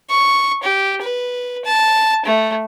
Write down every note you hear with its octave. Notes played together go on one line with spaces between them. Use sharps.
C#6
G4
B4
A5
A3